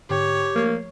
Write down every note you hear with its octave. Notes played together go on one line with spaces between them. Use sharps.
G#2 D3 G4 C#5 G5
F3 A3 A#3 C7